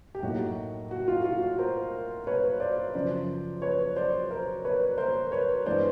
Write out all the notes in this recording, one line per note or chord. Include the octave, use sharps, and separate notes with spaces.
G4
A2 F#3 A#3 D#4 F#4
F#4
F4
F4
F#4
A#4 C5
B4 C#5
C5 D5
F#2 C#3 F3 C5 D5
B4 C#5
C5 D5
A#4 C5
B4 C#5
A#4 C5
B4 C#5
G2 E3 G#3 B3 E4 C5 D5